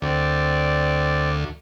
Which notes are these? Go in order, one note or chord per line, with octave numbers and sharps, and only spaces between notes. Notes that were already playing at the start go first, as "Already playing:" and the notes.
D2 C4 D5